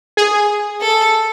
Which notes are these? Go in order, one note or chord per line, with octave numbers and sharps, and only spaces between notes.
G#4
A4